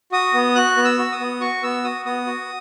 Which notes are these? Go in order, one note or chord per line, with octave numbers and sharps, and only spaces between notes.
F#4 D#6
B3
F#4 F#6
B3
E6
F#4
D#6
B3
F#4 C#6
B3 E6
F#4 D#6
B3 D#6
F#4